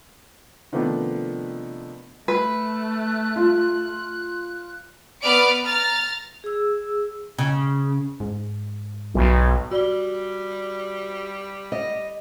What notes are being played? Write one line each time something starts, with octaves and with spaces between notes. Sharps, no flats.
C3 D#3 F3 A3 B3 D4
A3 B4 F#6
F4
B3 B4 D5 F6 D7
A#5 F6 A6
G#4 E6
C#3
G#2
B1
G3 F#4 D5 G7
D#5